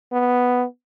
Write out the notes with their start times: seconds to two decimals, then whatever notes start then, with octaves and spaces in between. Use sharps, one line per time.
0.12 B3